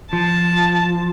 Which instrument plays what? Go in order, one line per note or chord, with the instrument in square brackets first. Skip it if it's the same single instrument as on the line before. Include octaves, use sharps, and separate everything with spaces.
[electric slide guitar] F3 [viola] A5